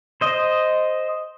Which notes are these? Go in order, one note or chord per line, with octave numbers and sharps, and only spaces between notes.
C5 D#5